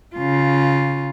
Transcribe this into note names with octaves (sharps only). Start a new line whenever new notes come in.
C#3 F4